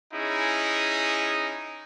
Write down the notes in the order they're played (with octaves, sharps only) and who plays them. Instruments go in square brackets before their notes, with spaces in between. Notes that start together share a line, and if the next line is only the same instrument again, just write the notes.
[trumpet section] C#4 D#4 E4 G#4